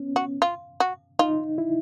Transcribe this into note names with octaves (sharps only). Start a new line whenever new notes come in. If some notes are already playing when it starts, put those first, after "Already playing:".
Already playing: B3 C#4
F#4
F4
F#4
D#4 F4
E4